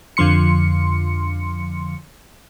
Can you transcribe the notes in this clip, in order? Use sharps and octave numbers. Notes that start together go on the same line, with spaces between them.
F2 D3 F3 C6 C#7